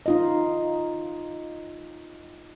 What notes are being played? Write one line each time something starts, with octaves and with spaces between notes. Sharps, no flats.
D#4 F4 D#5